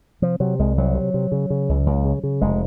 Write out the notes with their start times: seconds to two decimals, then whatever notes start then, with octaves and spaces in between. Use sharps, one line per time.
0.22 C3 F3
0.40 C3 F#3
0.59 C2 G#3
0.77 C2 F#3
0.95 C3
1.14 C3
1.32 C#3
1.50 C#3
1.69 C#2
1.86 C#2
2.05 C#3
2.23 C#3
2.41 F1 G#3